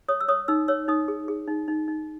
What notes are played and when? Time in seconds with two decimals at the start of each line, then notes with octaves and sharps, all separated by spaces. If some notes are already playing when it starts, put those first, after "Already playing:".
0.08 C#5 D#6
0.21 E6
0.28 C#5 D#6
0.48 D#4 E6
0.68 C#5 E6
0.88 D#4 D#6
1.08 G#4
1.28 G#4
1.47 D#4
1.68 D#4
1.88 D#4